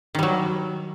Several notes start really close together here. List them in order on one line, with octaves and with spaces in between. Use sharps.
D#3 G3 F#3